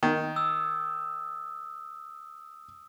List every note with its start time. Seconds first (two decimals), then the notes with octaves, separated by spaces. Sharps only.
0.03 D#3
0.36 D#6 E6